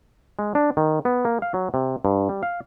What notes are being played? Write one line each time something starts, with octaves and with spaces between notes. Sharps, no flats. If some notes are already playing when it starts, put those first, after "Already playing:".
G#3
D4
D#3
B3
A#3
F5
F#3
C3
G2
G3
F5